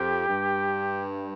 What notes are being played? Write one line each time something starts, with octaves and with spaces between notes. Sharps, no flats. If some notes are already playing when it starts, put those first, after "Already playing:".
Already playing: F2 G4
G2